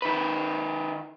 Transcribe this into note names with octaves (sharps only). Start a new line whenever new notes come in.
D#3 B4